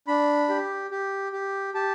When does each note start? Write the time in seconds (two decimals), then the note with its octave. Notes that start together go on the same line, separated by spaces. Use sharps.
0.08 D4 B5
0.49 G4
0.91 G4
1.32 G4
1.74 G4 A5